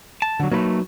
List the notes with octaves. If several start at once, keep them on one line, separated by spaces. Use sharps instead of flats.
A5
D3 F#3
F#3 A3 A#3 D#4 B4